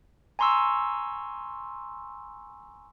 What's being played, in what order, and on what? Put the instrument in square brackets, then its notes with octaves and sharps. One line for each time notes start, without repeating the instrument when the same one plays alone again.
[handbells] G#5 A#5 C6 C#6 E6